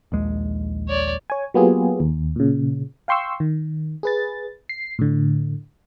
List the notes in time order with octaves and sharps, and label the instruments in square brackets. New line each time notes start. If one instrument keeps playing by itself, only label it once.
[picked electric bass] A#1 D#2 G#3
[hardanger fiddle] C#5 D5
[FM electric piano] C#5 G#5
F#3 A#3 B3 F4 G4 G#4
D#2
A#2 C#3
F5 G5 C6 C#6 E6
D#3
G#4 B4 A6
C7
A2 D3